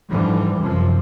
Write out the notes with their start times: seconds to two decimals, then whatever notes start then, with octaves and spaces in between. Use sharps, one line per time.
0.12 G#2 D3 E3 F3 G3
0.59 F#2 C3 F3